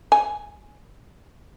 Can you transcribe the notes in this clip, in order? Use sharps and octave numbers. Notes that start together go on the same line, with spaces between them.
G#5